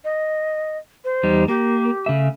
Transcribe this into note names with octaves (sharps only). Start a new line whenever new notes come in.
D#5
C5
E2 G3 D#4
A#3 G4
C#3 A3 E5